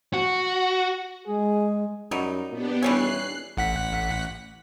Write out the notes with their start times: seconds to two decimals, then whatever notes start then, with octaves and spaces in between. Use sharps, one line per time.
0.13 F#4
1.27 G#3 G#4
2.11 F#2 F#3 G3 D#4
2.52 A#2 B3 D4 G4
2.83 D#1 E3 G3 C#4 F#6 C7
3.57 A1 F#5 B6